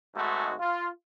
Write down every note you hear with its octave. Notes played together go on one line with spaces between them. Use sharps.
G#1 G#2 G#3 A3 F#4
F4